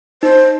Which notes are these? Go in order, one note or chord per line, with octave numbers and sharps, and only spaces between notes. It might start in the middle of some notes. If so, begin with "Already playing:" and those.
D#4 C5